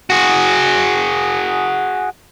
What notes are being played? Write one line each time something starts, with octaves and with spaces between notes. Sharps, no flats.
F#4 G#4